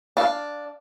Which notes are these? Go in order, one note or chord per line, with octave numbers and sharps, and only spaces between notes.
D4 F5